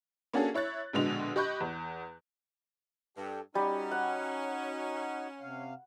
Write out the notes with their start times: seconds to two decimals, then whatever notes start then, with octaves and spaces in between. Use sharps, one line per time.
0.33 A#3 C#4 D4 F#4 G#4 A4
0.54 E4 C#5 F#6 A6
0.93 A#1 B2 D3 G#3 F7
1.36 G4 D#5 B5 C#6 F#6 G6
1.60 E2
3.17 G2 G4 A4
3.55 G3 C#4 D#4 F#4
3.91 F#5
5.41 C3 F5